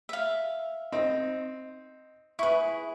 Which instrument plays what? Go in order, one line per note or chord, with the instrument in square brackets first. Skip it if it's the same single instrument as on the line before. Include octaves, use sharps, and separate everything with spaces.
[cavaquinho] E5 F5
[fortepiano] C4 D#4
[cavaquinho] E4 G#4 [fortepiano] B4 C#6